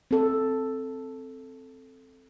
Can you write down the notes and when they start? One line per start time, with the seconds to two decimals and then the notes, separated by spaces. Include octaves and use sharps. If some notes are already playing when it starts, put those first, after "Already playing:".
0.11 C4 A4